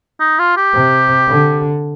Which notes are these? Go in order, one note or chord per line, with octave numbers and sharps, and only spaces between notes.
D#4
F4
G4
C3
D3